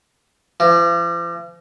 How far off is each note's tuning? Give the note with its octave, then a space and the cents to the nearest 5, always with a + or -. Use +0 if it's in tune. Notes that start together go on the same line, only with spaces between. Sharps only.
F3 -45